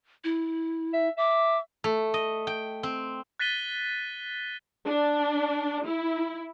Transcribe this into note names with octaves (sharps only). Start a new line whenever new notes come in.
E4
E5
E5 D6
A3
D#5
G5
C4
F#6 A6 B6 D#7 G7
D4
E4